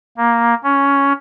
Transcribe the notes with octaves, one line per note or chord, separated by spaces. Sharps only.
A#3
C#4